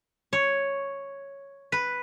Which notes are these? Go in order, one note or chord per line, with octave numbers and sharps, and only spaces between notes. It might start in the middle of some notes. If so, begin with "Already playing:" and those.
C#5
B4